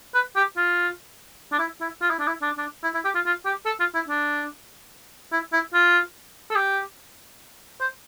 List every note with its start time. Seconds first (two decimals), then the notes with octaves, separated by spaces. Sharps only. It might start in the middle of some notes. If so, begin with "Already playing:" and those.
0.15 B4
0.36 G4
0.57 F4
1.52 D4
1.59 E4
1.81 E4
2.01 F4
2.10 E4
2.19 D4
2.27 E4
2.42 D4
2.58 D4
2.84 E4
2.94 E4
3.05 G4
3.15 F4
3.26 F4
3.46 G4
3.66 A4
3.80 F4
3.95 E4
4.08 D4
5.33 E4
5.53 E4
5.74 F4
6.50 A4
6.55 G4
7.81 C5